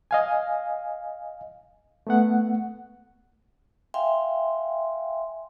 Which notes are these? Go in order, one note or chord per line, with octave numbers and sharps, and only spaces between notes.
D#5 F5 G#5
A3 B3 F#5
E5 F5 G5 G#5 C6